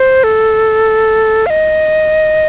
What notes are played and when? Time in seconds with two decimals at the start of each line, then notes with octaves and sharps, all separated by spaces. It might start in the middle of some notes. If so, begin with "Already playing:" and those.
Already playing: C5
0.23 A4
1.46 F5
1.50 D#5